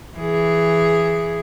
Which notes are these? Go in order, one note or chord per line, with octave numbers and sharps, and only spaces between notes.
E3 G#4